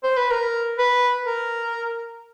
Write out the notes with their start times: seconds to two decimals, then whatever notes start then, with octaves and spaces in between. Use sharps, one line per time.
0.04 C5
0.17 B4
0.31 A#4
0.78 B4
1.26 A#4